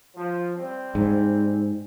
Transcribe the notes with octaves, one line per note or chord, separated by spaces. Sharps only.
F3
G3 C4
G#2